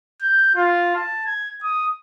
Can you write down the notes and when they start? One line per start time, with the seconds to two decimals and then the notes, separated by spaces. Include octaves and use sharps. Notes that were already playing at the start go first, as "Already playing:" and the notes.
0.22 G6
0.55 F4
0.95 A5
1.26 G#6
1.63 D#6